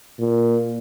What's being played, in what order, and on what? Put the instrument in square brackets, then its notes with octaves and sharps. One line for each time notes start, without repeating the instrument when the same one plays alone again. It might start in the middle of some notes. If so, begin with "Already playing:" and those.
[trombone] A#2